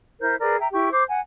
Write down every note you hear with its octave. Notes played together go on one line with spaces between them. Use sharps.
E4 A#4 C5 G6
G#4 A#4 B4 D5
E5 G5 A#5
E4 G4 C#6
C5 D6
F#5 G#5